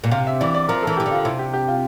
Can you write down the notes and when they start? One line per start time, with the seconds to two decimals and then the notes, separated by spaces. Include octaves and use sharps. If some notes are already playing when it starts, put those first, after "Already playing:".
0.04 A#2
0.11 C3 F5
0.27 E5
0.40 E3 D5
0.54 D5
0.69 F3 A#4
0.82 A4
0.87 E3
0.97 G4
1.00 E3
1.06 D3
1.11 F4
1.25 C3 E4
1.39 G4
1.53 G4
1.68 F4